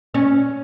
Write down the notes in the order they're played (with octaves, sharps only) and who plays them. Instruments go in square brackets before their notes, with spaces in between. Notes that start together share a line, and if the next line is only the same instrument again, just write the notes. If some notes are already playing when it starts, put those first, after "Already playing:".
[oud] C#4